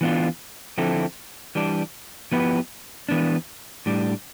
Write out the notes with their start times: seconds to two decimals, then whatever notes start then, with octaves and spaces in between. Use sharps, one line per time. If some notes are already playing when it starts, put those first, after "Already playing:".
0.01 E3 B3 D4 F4
0.78 D3 F3 C4 E4 A4
1.55 E3 G3 D4
2.32 F3 B3 E4 G4 B4
3.09 E3 B3 D4
3.86 A2 G3 D4